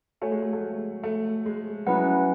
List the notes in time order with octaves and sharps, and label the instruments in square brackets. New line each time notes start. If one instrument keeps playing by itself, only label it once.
[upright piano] A3 [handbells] F#4 C#5 G#5
[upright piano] G#3
G#3
A3
A3
G#3
[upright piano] F#3 [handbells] C#4 E4 B4 F#5